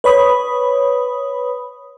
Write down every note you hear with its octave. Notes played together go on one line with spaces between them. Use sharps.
B4 C#5 B5 D#6